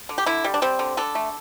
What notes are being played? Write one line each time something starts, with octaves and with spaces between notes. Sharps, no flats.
D3
G4
D3 E4
G3
D4
G3 C4
D3
D3 A4
A3